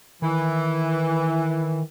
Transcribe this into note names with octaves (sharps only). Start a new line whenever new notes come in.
D#3 E3